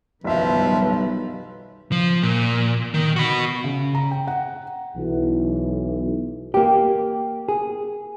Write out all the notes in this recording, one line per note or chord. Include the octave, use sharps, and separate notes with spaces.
F#1 B1 D#3 F3 G3 B4 E5
F3
A#2
D#3
F#4 B5
C#3
A#5
G5
F#5
B1 E3
A#3 G4
G#4